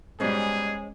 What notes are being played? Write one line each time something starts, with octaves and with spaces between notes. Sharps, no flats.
G#2 B2 G3 G#3 C#4 G#4 C5